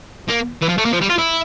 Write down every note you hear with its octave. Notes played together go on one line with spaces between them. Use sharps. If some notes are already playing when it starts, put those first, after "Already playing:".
A#3
E3
F3
A3
A#3
F3
G3
F4
E4